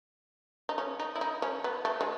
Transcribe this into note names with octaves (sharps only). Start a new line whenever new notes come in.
D#4
C#4
D#4
E4
D#4
C#4
B3
A3
G#3